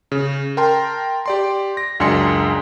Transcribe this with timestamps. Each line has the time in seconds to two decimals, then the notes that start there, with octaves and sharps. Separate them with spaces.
0.12 C#3
0.57 A#4 G5 A5 A#5 C6
1.26 G4 D5 C6
1.77 A#6
2.00 C#2 F#2 D4 G#5 C6 C#7